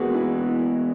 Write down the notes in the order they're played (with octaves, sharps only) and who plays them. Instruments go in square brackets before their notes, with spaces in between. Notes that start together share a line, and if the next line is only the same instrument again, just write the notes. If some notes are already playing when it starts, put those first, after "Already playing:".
Already playing: [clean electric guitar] E3 G#3 B3 [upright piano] A#3 F#4 G#4
[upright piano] E4